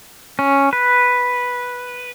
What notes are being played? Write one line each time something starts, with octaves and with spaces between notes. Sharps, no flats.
C#4
B4